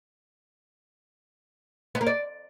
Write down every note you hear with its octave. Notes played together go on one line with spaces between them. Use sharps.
B3
A#3
D5